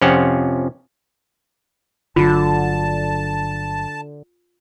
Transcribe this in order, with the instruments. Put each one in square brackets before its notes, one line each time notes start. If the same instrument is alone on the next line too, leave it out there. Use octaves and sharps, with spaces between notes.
[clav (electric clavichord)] F2 C3 F3 C#4 F#5
[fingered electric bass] G1 F#3 [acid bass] D3 [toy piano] F4 [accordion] A5